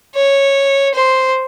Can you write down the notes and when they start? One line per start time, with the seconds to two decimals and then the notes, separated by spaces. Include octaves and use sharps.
0.15 C#5
0.95 C5